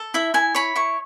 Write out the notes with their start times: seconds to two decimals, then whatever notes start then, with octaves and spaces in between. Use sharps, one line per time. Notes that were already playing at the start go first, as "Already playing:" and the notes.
Already playing: A4
0.14 E4 E5
0.34 E4 G#5
0.55 C#5 B5
0.76 E4 C#6